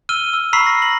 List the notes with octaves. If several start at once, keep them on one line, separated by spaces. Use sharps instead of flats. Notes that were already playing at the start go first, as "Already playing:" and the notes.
E6 F6 D#7 G7
E6
A#5 B5 C#6 E6 B6 C7
A#6
F#7